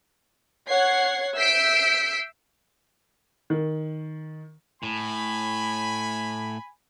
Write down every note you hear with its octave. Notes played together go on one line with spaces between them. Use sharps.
C#5 F#5 G#6 C7
E5 E6 G6 B6 C7 D7
D#3
A2 G#5 B5